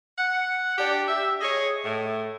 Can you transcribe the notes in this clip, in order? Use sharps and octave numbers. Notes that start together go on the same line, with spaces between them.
F#5
D4 G4
G4 E5
G#4 C#5 D#5
A2